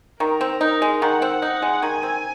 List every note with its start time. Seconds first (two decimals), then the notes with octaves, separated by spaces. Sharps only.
0.20 D#3 A#4
0.41 C4
0.61 D#4
0.82 G#3
1.02 D#3 F#5
1.22 C4
1.42 D#4
1.62 G#3
1.82 D#3 G#5
2.03 C4